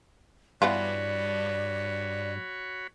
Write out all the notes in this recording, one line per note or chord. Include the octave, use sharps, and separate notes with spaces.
G2 E3 B3 F4 F#4 C#5 D5 B5